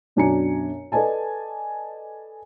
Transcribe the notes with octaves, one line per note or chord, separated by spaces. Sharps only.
B1 F#2 D4 G#5 A#5 C#7
A4 B4 D5 D#5 G#5 A5